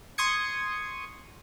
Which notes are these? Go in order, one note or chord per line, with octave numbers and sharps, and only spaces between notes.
C6 C#6 D#6 G#6 C#7